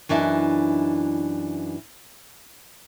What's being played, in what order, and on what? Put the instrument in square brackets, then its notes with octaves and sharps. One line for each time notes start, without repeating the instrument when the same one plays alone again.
[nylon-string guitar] F#2 E3 D4 D#4 E5